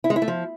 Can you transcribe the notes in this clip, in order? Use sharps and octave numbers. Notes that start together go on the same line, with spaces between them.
E4
G#3
E4
A3
F3